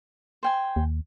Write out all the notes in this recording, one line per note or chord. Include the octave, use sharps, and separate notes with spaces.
C5 G5 G#5
D#2